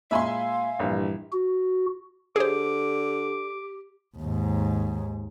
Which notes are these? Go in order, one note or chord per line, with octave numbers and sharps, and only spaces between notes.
A#2 G#3 E5 F5 G#5 B5 C6
A#1 G2 E3
F#4
D3 G4 G#4 C5 D6
D#2 G#2